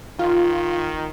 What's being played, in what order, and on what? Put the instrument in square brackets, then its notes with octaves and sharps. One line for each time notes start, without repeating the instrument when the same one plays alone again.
[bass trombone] D#3 [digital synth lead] F4